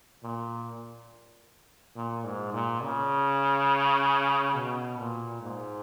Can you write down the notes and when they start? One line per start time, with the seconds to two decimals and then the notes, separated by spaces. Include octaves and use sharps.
0.23 A#2
1.96 A#2
2.25 G#2
2.53 A#2
2.83 C#3
4.55 B2
4.98 A#2
5.42 G#2